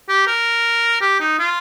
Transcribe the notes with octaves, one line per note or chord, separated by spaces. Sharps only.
G4
A#4
G4
D#4
F4